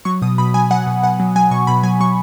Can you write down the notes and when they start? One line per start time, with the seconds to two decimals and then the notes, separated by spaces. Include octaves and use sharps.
0.05 F#3 C#6
0.22 B2 D#6
0.38 B2 B5
0.54 F#3 G#5
0.70 F#3 F#5
0.87 B2
1.03 B2 F#5
1.20 F#3
1.36 F#3 G#5
1.51 B2 C#6
1.67 B2 B5
1.83 F#3 G#5
2.00 F#3 C#6